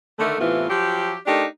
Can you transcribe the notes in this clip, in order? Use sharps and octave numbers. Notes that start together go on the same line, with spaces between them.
D3 D#3 A3
A2 C3 E3 B3 F4
F3 F#3 G4
A3 D4 D#4 G4 A#4